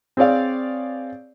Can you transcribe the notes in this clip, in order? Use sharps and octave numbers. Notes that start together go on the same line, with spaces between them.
C4 G#4 C#5 D5 F5